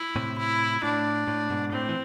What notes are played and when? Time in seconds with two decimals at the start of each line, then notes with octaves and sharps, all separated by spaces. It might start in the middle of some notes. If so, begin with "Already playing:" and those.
Already playing: E4
0.16 A2 C3
0.39 E4
0.83 A2 D4
1.28 A2
1.50 G#2 B2
1.73 A2 C4
1.89 E3